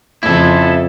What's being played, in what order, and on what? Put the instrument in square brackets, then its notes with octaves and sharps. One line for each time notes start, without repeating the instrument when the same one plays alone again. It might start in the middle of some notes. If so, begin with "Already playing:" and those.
[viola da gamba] F2 C#3 [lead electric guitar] E4 A4